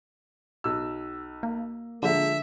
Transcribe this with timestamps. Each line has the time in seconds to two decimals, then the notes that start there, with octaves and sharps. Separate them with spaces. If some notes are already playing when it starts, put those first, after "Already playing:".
0.64 B1 E6
1.43 A#3
2.03 D3 F3 G#3 A#3 E5